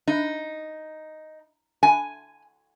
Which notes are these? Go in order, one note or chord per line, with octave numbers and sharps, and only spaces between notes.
D#4
G#5